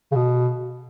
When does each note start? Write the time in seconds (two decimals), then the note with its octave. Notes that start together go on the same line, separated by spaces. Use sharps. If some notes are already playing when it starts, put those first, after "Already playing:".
0.12 C#3
0.16 B2